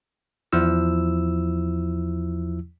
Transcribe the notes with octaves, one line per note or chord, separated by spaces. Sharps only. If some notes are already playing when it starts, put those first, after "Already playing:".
E2 F3 E4 E6